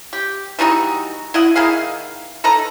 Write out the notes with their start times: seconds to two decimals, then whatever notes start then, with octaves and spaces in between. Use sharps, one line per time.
0.13 G4
0.59 E3 G3 D#4 F#4
1.34 E4 D#5 F#5
1.56 D#3 E4 G#4 F5
2.44 D#4 A4 B4 A#5